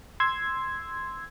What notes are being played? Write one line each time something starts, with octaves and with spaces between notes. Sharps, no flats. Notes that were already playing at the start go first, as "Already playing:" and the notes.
C6 E6 G#6